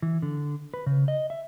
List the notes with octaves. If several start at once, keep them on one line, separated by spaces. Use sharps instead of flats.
E3
D3
B4
C#3
D#5
E5